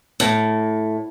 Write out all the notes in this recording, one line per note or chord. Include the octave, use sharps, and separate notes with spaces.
A2